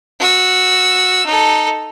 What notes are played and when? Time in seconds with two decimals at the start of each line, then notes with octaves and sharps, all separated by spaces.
0.19 F#4 E6
1.26 D#4 A4